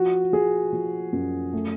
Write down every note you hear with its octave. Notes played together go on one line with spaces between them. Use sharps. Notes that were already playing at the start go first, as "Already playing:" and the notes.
Already playing: F3 F#4
F3 G#4
F3
F#2
A3